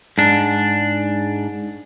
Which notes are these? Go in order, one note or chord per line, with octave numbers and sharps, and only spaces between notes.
G#2 D4